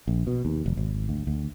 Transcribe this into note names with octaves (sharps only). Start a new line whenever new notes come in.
A#1
B2
D#2
F1
G#1
D2
D2